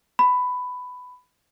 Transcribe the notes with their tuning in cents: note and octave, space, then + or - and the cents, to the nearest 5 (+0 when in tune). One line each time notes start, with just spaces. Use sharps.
B5 +10